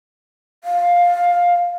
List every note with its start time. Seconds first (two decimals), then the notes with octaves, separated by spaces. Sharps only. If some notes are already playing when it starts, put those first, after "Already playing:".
0.64 F5